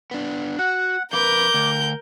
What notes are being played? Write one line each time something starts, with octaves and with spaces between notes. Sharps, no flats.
B3 D4
F#4 F#5
F2 A#4 B4 D6 G6
D2